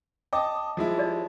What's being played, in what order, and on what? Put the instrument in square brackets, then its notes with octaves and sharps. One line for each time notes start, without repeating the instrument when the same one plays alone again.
[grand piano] D#5 A5 [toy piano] G5 D6 D#6
[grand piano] F3 G#3 E4
[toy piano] G4 D5 D#5